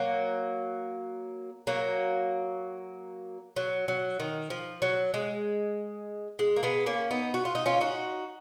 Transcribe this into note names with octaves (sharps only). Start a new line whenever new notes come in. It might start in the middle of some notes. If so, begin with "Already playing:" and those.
Already playing: F#3 A#3
F#3 A#3
F#3
F#3
D#3
F3
F#3
G#3
G#3
A#3
G#3 B3
A#3 C#4
B3 D#4
F#4
F4
D#4
C#4 F4
D#4 F#4